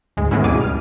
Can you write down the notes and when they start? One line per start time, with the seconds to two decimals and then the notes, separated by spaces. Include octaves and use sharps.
0.17 D2 G#2 G#3
0.31 D#3 G#3 A3 B3 C#4 E4
0.44 D2 B2 G3 G#4 D6 D#7
0.61 F6